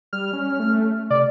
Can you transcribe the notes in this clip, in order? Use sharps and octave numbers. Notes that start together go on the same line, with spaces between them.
G3 F6
C#4
A3
C3 D5